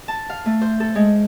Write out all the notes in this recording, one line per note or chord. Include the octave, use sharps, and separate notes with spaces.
A5
F5
A3
C5
A4
G#3